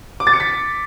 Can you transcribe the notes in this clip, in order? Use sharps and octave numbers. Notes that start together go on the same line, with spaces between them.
D6
A6
C#7
B6